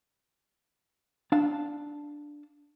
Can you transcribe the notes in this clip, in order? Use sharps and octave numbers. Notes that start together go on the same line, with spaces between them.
D4 F5 A5